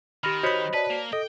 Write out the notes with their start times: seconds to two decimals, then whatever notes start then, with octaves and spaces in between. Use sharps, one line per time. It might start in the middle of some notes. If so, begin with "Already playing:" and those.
0.24 D#3 G4 B5 F6 A#6
0.43 F#4 C5 C#5 D#5 B5 G6 B6
0.73 B4 D5 A5 B6
0.90 A#3
1.13 A4 D#5 G5